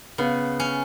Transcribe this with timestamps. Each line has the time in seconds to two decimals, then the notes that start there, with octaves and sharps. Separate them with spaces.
0.18 C#3 B3
0.60 C#4